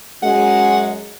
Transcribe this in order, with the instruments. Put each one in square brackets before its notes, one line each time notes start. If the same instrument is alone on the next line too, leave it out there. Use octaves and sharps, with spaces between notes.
[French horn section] F#2 F#3 G#3 [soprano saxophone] F#5